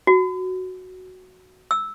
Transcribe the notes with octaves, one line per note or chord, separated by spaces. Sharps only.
F#4
E6